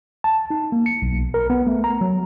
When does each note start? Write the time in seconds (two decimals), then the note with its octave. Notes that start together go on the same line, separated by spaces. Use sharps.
0.24 A5
0.50 D#4
0.72 A#3
0.86 C#7
1.02 B1
1.34 A#4
1.50 B3
1.67 A3
1.84 A#5
2.01 F#3